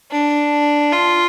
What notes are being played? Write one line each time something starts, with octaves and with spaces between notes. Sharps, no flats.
D4
F4